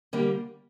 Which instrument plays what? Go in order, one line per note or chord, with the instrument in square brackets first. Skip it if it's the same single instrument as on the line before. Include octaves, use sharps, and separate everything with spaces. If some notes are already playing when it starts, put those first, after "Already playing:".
[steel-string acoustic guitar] D3 G3 A#3